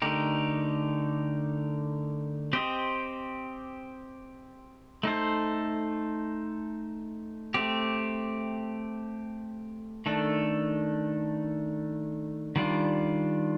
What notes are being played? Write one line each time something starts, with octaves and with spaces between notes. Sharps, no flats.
D3 A3 D#4 G4 A#4
C4 G4 C5 D#5
A3 D#4 A4 C5
A3 C4 G4
D#3 A3 D4 A4
D#3 G3 D4 F4